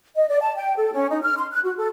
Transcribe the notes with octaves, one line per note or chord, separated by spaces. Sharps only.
D#5
D5
A5
G5
A4
C#4
D#4
F6
C6
F#6
F#4
A4